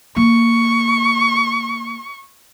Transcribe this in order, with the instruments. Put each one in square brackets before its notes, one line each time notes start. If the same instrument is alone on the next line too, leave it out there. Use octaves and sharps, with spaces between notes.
[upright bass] A#3 [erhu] C#6